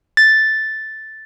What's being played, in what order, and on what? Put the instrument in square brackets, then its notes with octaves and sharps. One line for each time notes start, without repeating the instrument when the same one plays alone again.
[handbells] A6